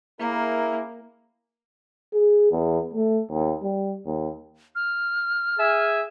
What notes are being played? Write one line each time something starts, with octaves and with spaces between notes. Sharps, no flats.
A#3 C#4 E4 G#4 A#4
G#4
E2
A3
D#2
G3
D#2
F6
G#4 E5 G#5